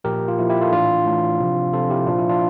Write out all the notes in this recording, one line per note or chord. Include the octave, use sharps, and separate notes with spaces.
A#2 F3 G4 A#4
F4
A#2 F3 E4
E4 G4
F4 A4
A2 E3 D4 F4
A2 E3
C3 F3
C3 F3 F4 A4
E4 G4
A#2 F3 D4 F4
E4
D4 F4